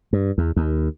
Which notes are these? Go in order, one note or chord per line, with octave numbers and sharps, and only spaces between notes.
G2
E2
D#2